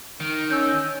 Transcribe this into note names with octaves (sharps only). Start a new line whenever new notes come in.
D#3
C#4 E6 G6